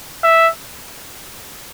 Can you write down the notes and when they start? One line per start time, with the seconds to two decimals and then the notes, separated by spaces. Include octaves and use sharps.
0.24 E5